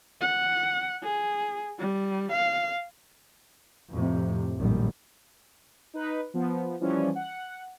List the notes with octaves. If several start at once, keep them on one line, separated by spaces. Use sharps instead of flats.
F#5
G#4
G3
F5
F2 A2 C3
A#1 F#2 A2 D#3 G3
D#4 B4
F3 B3
E3 F3 G3 C#4
F#5